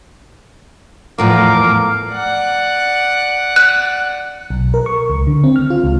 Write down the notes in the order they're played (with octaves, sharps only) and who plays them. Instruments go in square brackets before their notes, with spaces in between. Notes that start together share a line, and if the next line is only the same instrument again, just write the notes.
[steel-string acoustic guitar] E2 A2 F3 [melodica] A#4 F5 D6
[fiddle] D5 F#5
[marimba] F#6
[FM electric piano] B1
A#4
C#6
C#2
D3
C4
F6
F4
C#2